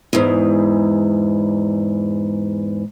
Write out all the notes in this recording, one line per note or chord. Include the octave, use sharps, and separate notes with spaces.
E2 G#2